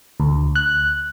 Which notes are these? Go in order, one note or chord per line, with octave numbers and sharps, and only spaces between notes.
D2
F#6